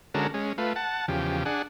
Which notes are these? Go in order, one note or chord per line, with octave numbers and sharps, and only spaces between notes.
D3 G#3 C#4 F#4 A4 A#4
G#3 C#4
A3 F4 B4
F#5 A5
E2 C#3 F3 G4
D4 G#4 F#5